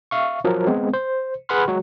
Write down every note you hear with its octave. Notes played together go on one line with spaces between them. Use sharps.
E5 F5 C#6
F3 F#3 A#4
G#3 B3 C4
C5
G#4 B4 F#5 B5 C6 F6
F#3 G#3 F#4